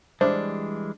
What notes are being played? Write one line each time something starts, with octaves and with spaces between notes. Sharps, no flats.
E3 G3 G#3 D4 C5